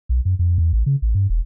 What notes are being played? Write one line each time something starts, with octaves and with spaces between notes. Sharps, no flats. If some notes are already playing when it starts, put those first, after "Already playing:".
B1
F#2
F2
E2
A1
C#3
A1
G2
E1